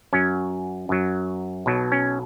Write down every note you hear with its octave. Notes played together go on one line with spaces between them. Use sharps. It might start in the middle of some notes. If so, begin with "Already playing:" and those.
F#2 F#3 C#4
F#2 F#3
B1 B2 F#3
C#4